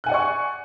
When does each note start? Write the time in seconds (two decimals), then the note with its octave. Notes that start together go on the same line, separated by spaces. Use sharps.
0.04 F#6
0.06 G#5
0.09 F#5
0.11 D5
0.14 C#6